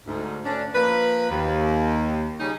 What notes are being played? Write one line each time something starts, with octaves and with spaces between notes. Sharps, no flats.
D2 G#2
D2 C#4 D4
F3 A#3 B4
D#2
C#3 G3 C#4 D#4 G#4